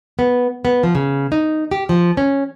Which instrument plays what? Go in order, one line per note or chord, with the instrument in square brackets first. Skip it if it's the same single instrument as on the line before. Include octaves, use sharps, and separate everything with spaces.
[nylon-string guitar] B3
B3
F3
C#3
D#4
G4
F3
C#4